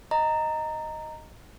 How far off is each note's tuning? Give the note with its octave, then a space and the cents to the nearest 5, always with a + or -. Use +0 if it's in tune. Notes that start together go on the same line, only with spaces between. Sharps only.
D#5 +0 A#5 -10